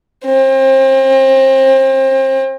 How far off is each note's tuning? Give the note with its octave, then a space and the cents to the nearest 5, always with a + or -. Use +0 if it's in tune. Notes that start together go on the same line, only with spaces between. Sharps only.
C4 +35